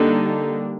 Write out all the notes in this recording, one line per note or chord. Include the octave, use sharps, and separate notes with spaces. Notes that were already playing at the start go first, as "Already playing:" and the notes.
Already playing: D3 G3 A#3 D4 D#4